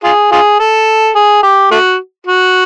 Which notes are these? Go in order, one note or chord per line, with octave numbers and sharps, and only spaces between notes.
F4 G#4
F4 G#4
A4
G#4
G4
A3 F#4
F#4